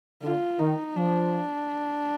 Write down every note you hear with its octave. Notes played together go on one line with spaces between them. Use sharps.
D3 F4
D#3 D#4
F3 D4